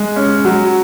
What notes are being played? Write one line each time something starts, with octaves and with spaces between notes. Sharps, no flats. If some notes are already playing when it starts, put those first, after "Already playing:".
Already playing: G#3
C#4
F#3